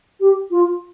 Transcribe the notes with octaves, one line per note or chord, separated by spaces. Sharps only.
G4
F4